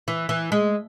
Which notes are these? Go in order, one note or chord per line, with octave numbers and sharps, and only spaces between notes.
E3
E3
G#3